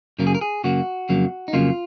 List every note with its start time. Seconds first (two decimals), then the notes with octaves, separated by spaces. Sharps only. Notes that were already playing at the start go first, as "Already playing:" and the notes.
0.19 F#2 C#3 F#3 A#3 A#4
0.27 G#4
0.35 A#4
0.41 G#4
0.64 F#2 C#3 F#3 A#3 F#4
1.09 F2 C#3 F#3 A#3
1.48 D#4
1.53 F2 C#3 F#3 A#3 F4